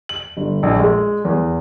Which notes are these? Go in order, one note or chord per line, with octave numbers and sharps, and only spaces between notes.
F#7
G1
A#1
G#3
E2